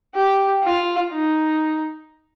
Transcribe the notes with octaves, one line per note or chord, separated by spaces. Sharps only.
G4
F4
D#4